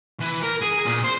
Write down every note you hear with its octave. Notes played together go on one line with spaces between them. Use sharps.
E3
A#4
G#4
A#2
C5